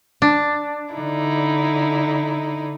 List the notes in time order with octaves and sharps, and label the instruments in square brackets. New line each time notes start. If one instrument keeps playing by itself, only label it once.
[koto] D4
[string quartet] D3 D#4 E4